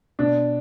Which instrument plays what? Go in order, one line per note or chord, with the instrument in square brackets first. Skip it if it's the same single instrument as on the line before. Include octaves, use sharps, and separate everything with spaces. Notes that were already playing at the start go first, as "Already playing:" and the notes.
[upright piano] B2 D4